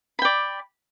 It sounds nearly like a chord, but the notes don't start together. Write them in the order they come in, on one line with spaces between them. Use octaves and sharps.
B5 G5 D5